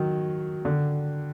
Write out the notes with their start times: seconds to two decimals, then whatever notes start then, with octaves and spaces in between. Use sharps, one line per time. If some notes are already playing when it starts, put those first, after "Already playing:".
Already playing: D#3 F#3
0.65 D3